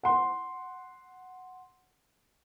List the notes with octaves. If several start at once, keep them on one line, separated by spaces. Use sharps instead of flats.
F#5 C6